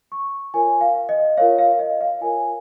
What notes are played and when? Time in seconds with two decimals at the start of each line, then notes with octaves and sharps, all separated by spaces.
0.12 C#6
0.54 F4 A#4 C#5 G#5
0.81 F5
1.09 D#5
1.37 F4 A#4 C#5 F5
1.59 F5
1.79 D#5
2.01 F5
2.21 F4 A#4 C#5 G#5